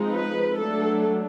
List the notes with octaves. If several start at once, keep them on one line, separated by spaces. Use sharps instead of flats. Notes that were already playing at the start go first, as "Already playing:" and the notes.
Already playing: F3 G#3 C4 D#4
B4
F#3 A3 D4 A4